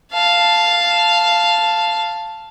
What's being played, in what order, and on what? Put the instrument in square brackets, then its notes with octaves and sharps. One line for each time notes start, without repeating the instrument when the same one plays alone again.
[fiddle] F5 A5